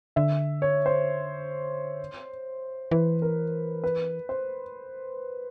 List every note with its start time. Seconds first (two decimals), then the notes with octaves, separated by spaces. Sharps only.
0.16 D3 E5
0.62 C#5
0.86 C5
2.91 E3 B4
3.22 A#4
3.84 B4
4.29 C5